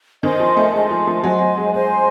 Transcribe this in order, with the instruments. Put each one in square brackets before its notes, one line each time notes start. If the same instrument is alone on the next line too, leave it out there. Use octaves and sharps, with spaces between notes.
[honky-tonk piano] D#3 [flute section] C5 D#5 G#5 C6
[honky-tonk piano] F3
A3
[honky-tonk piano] G#3 [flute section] C5 D#5 G#5 C6
[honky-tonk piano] F3
F3
[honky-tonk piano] F#3 [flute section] C5 D#5 G#5 C6
[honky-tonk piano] F#3
G#3
[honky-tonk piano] G#3 [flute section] C5 D#5 G#5 C6